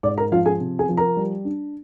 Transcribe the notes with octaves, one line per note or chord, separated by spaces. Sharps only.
G#2 D5 D6
A#4 A#5
F3 F4 F5
G#4 G#5
C3
G#4 G#5
F3
A#4 A#5
G3
D4